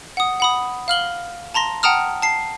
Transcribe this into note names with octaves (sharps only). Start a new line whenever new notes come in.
F#5 D#6
F#5 B5 D#6
F5 F6 F#7 G7
A5 A#5 C6 A#6
F#5 G5 A5 A#5 D#6 F6
A5 C7